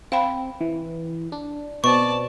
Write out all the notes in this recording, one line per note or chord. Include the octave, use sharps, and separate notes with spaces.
C4 F5 G5 B5
E3
D4
B2 C4 D5 A5 C#6